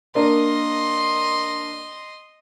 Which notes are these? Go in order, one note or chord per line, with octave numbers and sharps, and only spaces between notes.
A#3 D4 A#4 D#5 C6